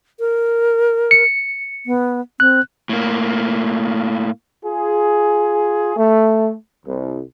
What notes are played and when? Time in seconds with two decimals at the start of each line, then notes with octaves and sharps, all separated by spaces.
0.20 A#4
1.11 C#7
1.86 B3
2.40 C4 F#6
2.89 A2 A#3
4.63 F4 G#4
5.96 A3
6.85 C2